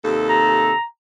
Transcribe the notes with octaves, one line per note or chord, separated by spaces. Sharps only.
D#2 C3 A4
A#5